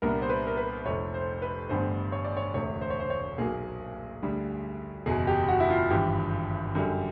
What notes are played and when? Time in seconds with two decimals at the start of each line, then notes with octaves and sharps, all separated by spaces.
0.02 C2 A#2 G3 B3 D4 A#4
0.22 C5
0.29 B4
0.47 A#4
0.57 B4
0.85 F1 F2 C3 C#5
1.14 C5
1.42 B4
1.69 A1 G2 D3 G3 B3 C5
2.12 C#5
2.24 D5
2.37 C#5
2.54 E1 D2 C3 C#5
2.81 C5
2.90 C#5
3.00 C5
3.10 C#5
3.38 B1 A#2 F#3 A#3 G#4
4.23 D2 D3 G3
5.06 F#1 E2 B2 G#4
5.27 G4
5.48 F#4
5.60 E4
5.70 F4
5.90 G#1 G2 E3 G4
6.75 F#2 D3 G3